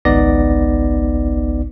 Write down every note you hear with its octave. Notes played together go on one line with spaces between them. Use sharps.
G#1 C#2 B3 D#4 D5 A#6